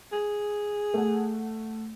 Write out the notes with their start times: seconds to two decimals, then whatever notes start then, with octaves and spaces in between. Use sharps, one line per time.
0.12 G#4
0.94 A3 F#5